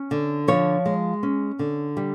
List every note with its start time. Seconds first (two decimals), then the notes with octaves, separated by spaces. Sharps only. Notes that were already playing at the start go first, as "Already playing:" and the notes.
Already playing: C#4
0.11 D3
0.48 F3 C#5
0.86 G#3
1.23 C#4
1.59 D3
1.97 G3